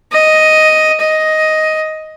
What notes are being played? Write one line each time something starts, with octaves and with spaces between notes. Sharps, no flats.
D#5
D#5